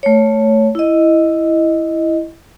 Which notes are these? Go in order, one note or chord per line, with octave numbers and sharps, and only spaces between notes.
A3 C#5
E4 D#5